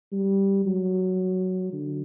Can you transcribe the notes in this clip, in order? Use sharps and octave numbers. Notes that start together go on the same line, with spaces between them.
G3
F#3
D3